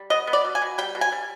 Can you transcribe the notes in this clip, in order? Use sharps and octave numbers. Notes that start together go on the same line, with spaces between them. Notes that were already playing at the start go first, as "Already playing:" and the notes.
Already playing: G3
B3 D#5
B3
D5
B2
G#5
B2
G3 G5
B2
G#5
G3